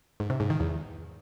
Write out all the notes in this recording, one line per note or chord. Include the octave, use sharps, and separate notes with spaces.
G#2
C3
G#2
D#3
E2